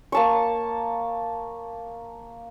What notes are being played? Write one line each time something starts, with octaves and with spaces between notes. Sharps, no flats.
A#3 A5 C#6